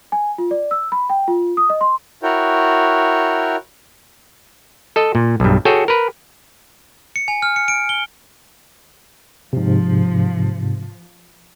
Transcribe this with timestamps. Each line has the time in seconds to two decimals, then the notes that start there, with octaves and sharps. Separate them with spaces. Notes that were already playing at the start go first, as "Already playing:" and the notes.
0.12 G#5
0.38 F4
0.51 D5
0.71 E6
0.92 B5
1.10 G5
1.28 F4
1.57 D#6
1.70 D#5
1.81 C6
2.23 E4 F#4 A#4 C#5 G5
4.96 A4 D#5
5.15 A#2
5.40 B1 G2
5.65 F#4 G#4 A4 C#5 G5
5.88 A#4 B4
7.16 C#7
7.28 G#5
7.42 F6
7.56 C#7
7.68 D7
7.89 G7
9.53 G#2 C3 F3